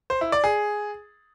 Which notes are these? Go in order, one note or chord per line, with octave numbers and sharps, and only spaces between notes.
C5
E4
D5
G#4